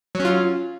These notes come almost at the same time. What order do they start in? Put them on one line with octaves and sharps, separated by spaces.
F#3 C#4 F4